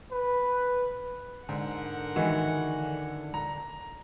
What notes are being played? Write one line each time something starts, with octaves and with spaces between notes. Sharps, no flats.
B4
G#2 D3 A#4 F#5
D#3 E3 G#3 F#4
A#5